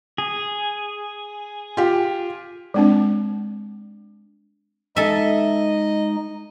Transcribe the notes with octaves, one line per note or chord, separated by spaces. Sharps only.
G#4
F4 G4
G#3 C4 D4
G#3 D#4 A4 D#5 E5